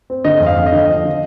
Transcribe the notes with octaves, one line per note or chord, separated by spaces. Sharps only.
C4
D3 D#5
F2
F5
F2
D#5
D3
F3
D3